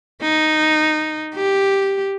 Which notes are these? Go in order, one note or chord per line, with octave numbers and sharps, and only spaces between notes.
D#4
G4